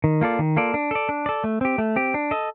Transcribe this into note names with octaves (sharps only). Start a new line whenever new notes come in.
D#3
A#3 F4 A4 D5
D#3
A#3 F4 A4 D5
D4
A4 D5
D4
A4 D5
A3
C4 G4
A3
C4 G4
D4
A4 D#5